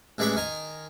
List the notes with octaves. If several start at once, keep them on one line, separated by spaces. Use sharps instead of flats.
A1 E3 G#3 D4 B5 C#6
D#3 G#5 A#5